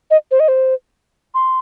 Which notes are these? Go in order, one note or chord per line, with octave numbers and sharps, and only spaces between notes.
D#5
C5
D#5
C5
C6